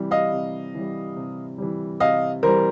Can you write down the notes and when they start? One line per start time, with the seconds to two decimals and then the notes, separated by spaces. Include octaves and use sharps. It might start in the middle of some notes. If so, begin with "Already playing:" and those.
Already playing: C3 E3 G3
0.11 D#5 F5
0.33 C3
0.75 E3 G3
1.16 C3
1.58 E3 G3
2.00 C3 D#5 F5
2.43 E3 G3 A#4 C5